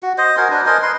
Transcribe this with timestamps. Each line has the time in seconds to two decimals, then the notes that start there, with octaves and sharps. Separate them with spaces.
0.03 F#4
0.18 C5 D#5
0.37 F#4 A#4 C5 G#5
0.50 D4 B4
0.66 A#4 C5 D#5 G#5
0.83 B4 C6